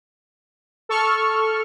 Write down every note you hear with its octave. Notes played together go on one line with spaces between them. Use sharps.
A4 C#6 F6